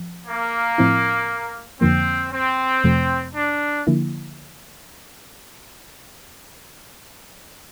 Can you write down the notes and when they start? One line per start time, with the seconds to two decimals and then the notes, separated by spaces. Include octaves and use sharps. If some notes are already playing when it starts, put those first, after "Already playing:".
Already playing: F3
0.27 A#3
0.78 A2 F3 C4 E4
1.81 F2 D3 F3 A#3 C4
2.33 C4
2.84 F2 C3 F3 A3
3.35 D4
3.87 D3 F3 A#3 E4